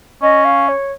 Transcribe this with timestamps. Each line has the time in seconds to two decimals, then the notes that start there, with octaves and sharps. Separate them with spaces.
0.22 C#4 D#5
0.45 F5
0.68 C#5